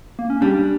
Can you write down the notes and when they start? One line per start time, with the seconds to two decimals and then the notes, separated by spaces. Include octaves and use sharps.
0.19 A#3
0.30 C#4
0.41 G3 D4